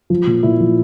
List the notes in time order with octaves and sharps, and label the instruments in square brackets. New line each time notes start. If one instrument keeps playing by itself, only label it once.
[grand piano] F3
A#2
A#2 E4
F3